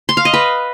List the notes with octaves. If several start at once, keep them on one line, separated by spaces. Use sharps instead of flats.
C6
F5
D#5
B4